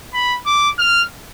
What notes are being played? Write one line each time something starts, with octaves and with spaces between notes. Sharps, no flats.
B5
D6
F6